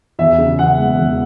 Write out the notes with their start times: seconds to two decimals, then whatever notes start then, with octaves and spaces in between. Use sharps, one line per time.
0.19 E2 E5
0.38 C#3
0.59 E3 F#5
0.78 E1
0.99 E2